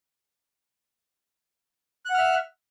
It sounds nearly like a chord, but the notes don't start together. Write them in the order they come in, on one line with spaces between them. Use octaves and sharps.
F#6 F#5 F6 E5